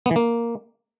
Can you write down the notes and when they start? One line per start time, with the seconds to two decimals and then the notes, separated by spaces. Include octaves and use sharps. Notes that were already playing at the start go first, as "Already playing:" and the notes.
0.06 B3
0.11 E3
0.16 A#3